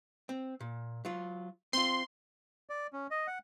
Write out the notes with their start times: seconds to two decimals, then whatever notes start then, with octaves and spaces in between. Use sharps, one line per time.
0.29 C4
0.61 A#2
1.05 F#3 F4
1.73 C4 F4 C6
2.70 D5
2.93 C#4
3.11 D#5
3.27 F#5